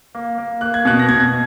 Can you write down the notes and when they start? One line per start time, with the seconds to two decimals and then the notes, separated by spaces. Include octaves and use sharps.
0.15 A#3
0.38 A#3
0.61 A#3 F#6
0.74 G#6
0.85 B2 F#6
0.99 A#6
1.09 B2 G#6